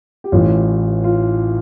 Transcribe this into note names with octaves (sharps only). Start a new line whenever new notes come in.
G4
A1 A2 E3 F4
F4